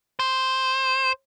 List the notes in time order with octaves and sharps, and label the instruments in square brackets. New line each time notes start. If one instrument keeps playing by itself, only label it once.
[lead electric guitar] C5